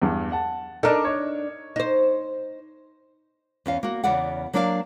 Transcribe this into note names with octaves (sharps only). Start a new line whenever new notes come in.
E2 G2
F#5 A5
D4 D#4 A4 A#4
C#5 D#5
D#4 C5
E2 C#4 F5
A#3 F#4
E2 C#3 B3 D5 F#5
F#3 A#3 D4 E4 D5 F5